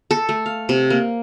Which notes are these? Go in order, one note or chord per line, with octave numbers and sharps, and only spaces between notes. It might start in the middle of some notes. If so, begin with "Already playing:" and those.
A4
A3
F5
C3
A#3